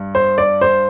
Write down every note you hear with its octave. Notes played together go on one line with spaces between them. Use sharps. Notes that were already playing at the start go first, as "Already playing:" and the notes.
Already playing: G2
C5
D5
C5